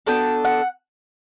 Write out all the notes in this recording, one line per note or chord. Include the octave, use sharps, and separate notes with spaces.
B3 D4 F#4 A4 G5
F#5